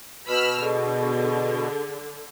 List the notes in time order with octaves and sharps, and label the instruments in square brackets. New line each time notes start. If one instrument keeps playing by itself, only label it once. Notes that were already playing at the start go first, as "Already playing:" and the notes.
[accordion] B2 [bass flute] B4 [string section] B5 E6 F6
[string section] D3 [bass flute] G#4